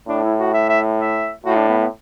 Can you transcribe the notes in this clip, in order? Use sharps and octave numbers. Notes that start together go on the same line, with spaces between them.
A2 D4
E4
F#4
E5
E5
E5
A2 F#4
D4
B3
B3